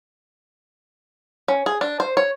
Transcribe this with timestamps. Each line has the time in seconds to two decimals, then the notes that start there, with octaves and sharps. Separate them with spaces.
1.48 C#4
1.66 G#4
1.81 D4
2.00 C5
2.17 C#5